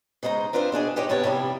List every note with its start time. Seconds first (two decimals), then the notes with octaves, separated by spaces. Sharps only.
0.23 C#3 G#3 D#4 C5 A#5
0.53 C4 D4 F4 B4 C5 E5
0.72 B2 D4 G#4 D#5
0.96 D#4 G4 C5 C#5 D#5
1.09 G2 C3 B3 C#5 A5
1.24 C3 F3 G3 E4